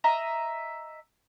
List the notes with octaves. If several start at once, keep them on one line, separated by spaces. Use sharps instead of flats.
D#5 E5 A#5